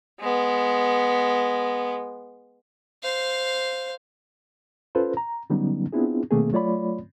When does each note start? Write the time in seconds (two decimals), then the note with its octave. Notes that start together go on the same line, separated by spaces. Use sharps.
0.20 G#3 B3
3.03 C5 F5
4.95 C#4 F4 A4 B4 C5
5.17 A#5
5.50 D3 F#3 G3 B3 C#4 D#4
5.93 B3 C4 D4 E4 F4 G#4
6.31 B2 D#3 A3 A#3 C4 G#4
6.52 F#3 A3 F4 C#5 D5 B5